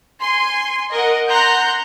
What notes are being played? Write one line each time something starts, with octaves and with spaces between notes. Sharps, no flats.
G#5 C6
A#4 D#5 F#5
F#5 A#5 C6 F#6 G6